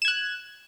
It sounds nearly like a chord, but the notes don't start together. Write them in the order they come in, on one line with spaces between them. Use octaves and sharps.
E7 G#6 F#6